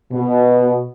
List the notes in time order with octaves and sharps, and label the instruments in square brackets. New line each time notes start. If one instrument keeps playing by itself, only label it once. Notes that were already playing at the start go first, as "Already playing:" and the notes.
[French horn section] B2